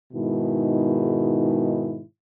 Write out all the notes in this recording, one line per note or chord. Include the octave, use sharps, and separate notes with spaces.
G#2 B2 D#3 G#3 E4